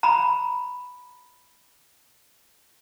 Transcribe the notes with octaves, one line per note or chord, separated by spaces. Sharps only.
A#5 B5